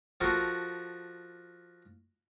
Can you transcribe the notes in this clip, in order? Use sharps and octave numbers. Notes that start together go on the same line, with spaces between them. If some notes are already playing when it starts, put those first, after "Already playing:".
F3 F#4 A4 A#4